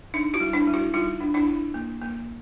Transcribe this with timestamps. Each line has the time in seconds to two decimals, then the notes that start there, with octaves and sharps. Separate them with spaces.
0.14 D4 D#4
0.34 E4 F#4
0.40 G3
0.53 D4 E4
0.67 G3
0.74 E4 F#4
0.94 G3 D#4 F4
1.20 D4
1.34 D4 E4
1.47 D4
1.74 A#3
2.01 A#3